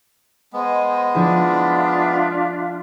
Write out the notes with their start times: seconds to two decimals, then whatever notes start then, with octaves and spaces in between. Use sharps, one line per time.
0.53 G#3 B3 C5 D#5 G#5
1.15 F3 D4 E4 F4 G#4 E5